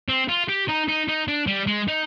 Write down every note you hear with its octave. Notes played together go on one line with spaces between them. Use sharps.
C4
F4
G4
D#4
D#4
D#4
D4
G3
G#3
D#4